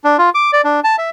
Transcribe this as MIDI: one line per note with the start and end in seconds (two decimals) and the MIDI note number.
0.04 0.17 62
0.19 0.30 65
0.35 0.51 86
0.53 0.61 74
0.64 0.80 62
0.84 0.96 81
0.98 1.10 76